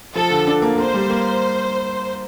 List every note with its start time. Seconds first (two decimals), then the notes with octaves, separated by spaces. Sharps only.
0.15 F3 A4
0.31 D3
0.47 D4
0.62 A#3
0.78 A#3 C5
0.94 G3
1.10 A#3